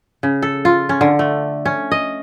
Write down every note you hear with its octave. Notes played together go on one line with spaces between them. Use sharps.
C#3
A4
F4
C#4
D3
A3
C#4
D#5